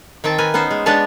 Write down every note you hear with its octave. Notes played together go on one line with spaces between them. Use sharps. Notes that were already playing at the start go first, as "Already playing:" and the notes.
D#3 C4 G5 A5
A#4 B4 G#5
B3 C#4 D#4 C5
G#3
G#3 B3 D4 B4 C#5 A5